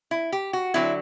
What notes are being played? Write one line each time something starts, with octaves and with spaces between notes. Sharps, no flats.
E4
G4
F#4
D3 F#3 C4 E4